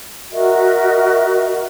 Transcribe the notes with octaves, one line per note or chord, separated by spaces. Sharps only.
F#4 A#4 D#5 E5